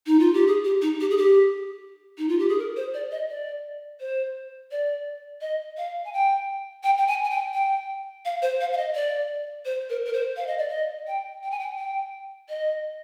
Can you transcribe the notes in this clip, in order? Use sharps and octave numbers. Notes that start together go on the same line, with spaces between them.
D#4
F4
G4
G#4
G4
D#4
G4
G#4
G4
D#4
F4
G4
G#4
A#4
C5
D5
D#5
D5
C5
D5
D#5
F5
G#5
G5
G5
G5
G#5
G#5
G5
G5
F5
C5
F5
F5
D#5
D5
C5
A#4
A#4
C5
F5
D#5
D5
D#5
G5
G5
G#5
G5
G5
D#5